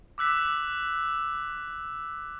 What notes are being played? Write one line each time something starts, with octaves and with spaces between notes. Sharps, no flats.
D6 E6 F#6 B6